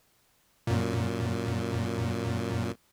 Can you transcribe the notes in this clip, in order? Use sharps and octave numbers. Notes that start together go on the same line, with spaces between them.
F#2 A#2